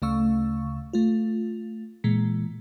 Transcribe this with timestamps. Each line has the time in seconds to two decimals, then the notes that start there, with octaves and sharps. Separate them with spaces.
0.02 D2 C#3 A3 F5 C#6 E6
0.93 A3 F4
2.04 A#2 E3 G#3